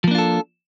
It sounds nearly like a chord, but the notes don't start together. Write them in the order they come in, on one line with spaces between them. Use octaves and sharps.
F3 A#3 D4 F4 A4